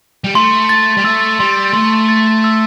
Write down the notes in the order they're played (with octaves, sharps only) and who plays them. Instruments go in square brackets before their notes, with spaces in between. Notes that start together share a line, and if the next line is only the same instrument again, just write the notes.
[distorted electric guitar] G3
[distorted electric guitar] A3 [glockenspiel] C6
[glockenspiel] A6
[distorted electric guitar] G3
[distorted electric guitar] A3 [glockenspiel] E6
[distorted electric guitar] G3 [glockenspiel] C6
[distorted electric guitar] A3 [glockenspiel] C6
[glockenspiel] A6
E6